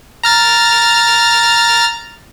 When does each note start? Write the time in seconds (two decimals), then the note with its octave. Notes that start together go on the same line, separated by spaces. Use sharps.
0.24 A#5 F6 A6